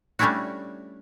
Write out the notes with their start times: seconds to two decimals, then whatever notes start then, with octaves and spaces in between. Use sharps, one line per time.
0.19 G3 A3 C#4 D4 E4 F#4